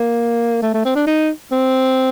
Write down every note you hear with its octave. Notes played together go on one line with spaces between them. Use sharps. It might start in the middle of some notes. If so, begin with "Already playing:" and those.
Already playing: A#3
A3
A3
C4
D4
D#4
C4